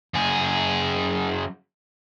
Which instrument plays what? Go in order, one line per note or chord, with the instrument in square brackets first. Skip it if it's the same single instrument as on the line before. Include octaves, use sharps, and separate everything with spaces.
[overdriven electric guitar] F#2 G#4